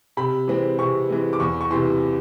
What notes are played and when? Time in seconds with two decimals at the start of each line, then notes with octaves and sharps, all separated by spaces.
0.17 C3 B5
0.48 E3 G#3 C4
0.79 C3 C#6
1.09 E3 G#3 C4
1.33 D6
1.40 E2 C#6
1.61 C#6
1.71 C3 E3 C6